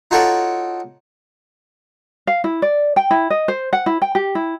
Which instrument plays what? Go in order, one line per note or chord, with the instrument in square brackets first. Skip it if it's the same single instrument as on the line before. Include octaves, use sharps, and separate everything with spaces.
[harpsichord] D#4 F4 F#4 A4 C#5 D5
[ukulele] F5
E4
D5
G5
E4
D#5
C5
F#5
E4
G5
G4
E4